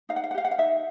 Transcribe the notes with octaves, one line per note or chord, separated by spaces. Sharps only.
D#4 F5
F#5
F5
F#5
G4 F5
F#5
F5
D#4 E5